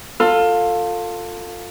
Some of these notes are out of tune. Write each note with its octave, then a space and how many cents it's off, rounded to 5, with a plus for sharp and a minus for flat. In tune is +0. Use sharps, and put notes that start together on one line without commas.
F4 +15 A4 +25